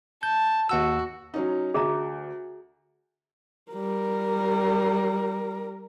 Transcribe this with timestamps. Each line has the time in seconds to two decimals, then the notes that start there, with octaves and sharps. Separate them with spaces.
0.23 A5 G6
0.69 D#2 F#4 F#5 E6
1.34 F#3 C#4 D#4
1.74 D2 G#4 E5 A#5
3.72 G3 A#4